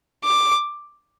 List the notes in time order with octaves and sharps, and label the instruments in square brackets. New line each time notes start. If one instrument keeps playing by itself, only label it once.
[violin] D6